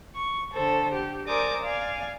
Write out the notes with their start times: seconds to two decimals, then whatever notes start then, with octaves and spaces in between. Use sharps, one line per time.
0.15 C#6
0.52 D3 A4 C5
0.93 G4
1.27 A#4 C5 D5 G#5 D6 D#6
1.61 D5 F5 G#5